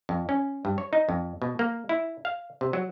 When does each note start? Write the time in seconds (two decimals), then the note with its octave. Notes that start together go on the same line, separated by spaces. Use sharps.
0.09 F2
0.29 C#4
0.65 G2
0.78 C#5
0.93 D#4
1.09 F2
1.42 B2
1.59 A#3
1.89 E4
2.25 F5
2.61 C3
2.73 F#3